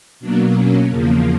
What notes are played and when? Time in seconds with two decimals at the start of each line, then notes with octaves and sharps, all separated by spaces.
0.20 B2 F#3 A#3 D4
0.56 C#4
0.90 E2 C#3 F3 A#3